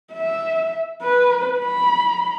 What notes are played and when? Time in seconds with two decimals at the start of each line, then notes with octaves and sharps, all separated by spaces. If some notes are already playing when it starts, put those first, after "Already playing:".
0.13 E5
1.02 B4
1.59 B5